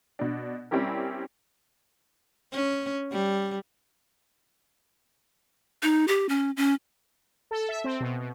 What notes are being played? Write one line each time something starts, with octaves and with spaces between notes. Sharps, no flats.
B2 D4
G3 C4 C#4 E4 G4 A#4
C#4
G3
D#4
G4
C#4
C#4
A4
E5
C4
B2
B2